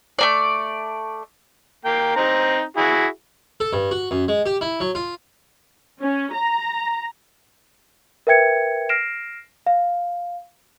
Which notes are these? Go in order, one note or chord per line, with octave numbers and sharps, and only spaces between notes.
A3 A#3 D5
A#3 G5
C4 D#4 A#5
E4 F#4 G#4
A4
G2
F#4
F#2
G#3
G4
E4
F#3
F4
C#4
A#5
A#4 B4 E5 G5 G#6 C#7
F6 A#6 C7 D7 E7
F5